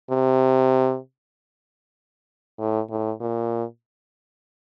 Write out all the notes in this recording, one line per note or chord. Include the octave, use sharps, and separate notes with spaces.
C3
A2
A2
A#2